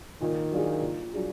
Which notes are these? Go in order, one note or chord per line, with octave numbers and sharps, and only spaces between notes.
A#2 D#3
F#3 D4 F4 G#4
A#2
F#3 D4 G#4